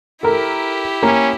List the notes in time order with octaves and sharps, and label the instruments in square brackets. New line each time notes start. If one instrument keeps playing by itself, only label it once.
[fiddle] E4 G4 [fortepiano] A4 A#4
[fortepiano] A#3 [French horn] C#4